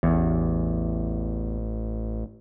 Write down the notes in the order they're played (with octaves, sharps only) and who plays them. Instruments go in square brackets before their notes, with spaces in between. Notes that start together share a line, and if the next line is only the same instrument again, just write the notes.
[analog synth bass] A1 [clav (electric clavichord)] E2